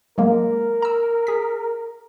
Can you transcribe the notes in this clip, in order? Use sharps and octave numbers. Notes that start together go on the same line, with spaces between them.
F#3 G#3 A#3 A#4
A#5 E6
G#4 B6